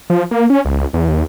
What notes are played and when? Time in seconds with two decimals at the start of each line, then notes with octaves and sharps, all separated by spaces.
0.10 F3
0.31 A#3
0.50 C#4
0.65 C#2
0.93 E2
1.09 D#2